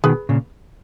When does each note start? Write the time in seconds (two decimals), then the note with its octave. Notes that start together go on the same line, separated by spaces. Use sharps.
0.04 B2 D#3 G#4 B4
0.29 A#2 C#3